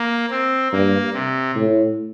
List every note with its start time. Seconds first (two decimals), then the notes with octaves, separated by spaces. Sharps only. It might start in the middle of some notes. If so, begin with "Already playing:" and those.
Already playing: A#3
0.30 C4
0.72 G2 A#3
1.13 C3
1.56 A2